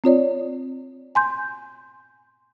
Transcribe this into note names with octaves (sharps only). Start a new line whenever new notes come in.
C4 F4 C#5 D5
G#5 C6 G6